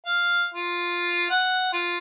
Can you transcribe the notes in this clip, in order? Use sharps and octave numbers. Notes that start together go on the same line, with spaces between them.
F5
F4
F#5
F4